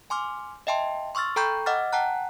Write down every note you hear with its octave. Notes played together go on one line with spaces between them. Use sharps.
G#5 C6 D6 F6
D#5 E5 G5 A5 C6
C6 C#6 E6 F6 A6
A4 G5 A#5 B5 C#6 G6
D#5 F#5 D6 E6 F6 A6
F#5 G5 A5 A#5 F#6